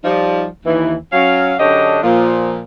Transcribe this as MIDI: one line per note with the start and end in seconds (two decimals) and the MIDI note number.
0.05 0.45 53
0.05 0.45 55
0.05 0.45 63
0.65 0.94 39
0.65 0.94 52
1.12 1.54 54
1.12 1.54 61
1.12 1.54 77
1.59 1.98 42
1.59 1.98 50
1.59 1.98 62
1.59 1.98 67
1.59 1.98 73
1.59 1.98 75
2.03 2.60 46
2.03 2.60 53